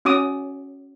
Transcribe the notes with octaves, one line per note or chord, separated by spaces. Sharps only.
C#4 F#4 D6 D#6